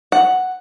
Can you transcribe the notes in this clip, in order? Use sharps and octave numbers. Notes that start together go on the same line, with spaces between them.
F#5